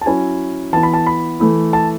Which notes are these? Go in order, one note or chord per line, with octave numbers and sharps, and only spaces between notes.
A5
F#3 C#4 E4 G#5
E3 B3 E4 A5
B5
A5
B5
E3 A3 E4
A5